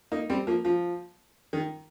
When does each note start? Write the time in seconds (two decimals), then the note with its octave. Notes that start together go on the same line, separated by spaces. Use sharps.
0.12 A#3 D#4
0.29 G3 C4
0.47 F3 A#3
0.65 F3
1.53 D#3